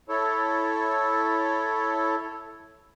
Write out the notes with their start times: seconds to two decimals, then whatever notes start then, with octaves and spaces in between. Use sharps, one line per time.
0.09 E4 A4 C#5